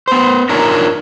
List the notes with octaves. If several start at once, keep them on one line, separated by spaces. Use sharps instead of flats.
B3 C5
D4 D#4 F4 A#4 C#5